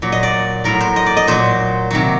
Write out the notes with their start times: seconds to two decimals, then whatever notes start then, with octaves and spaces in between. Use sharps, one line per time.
0.02 A#2 F#3
0.12 D#5
0.23 D5
0.64 A2 F#3 A#4
0.81 C5
0.96 D#5
1.06 D5
1.17 D#5
1.27 A#2 F#3 C5
1.91 C3 D#3 F#3